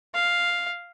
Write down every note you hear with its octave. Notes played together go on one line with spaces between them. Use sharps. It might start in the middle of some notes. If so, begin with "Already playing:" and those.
F5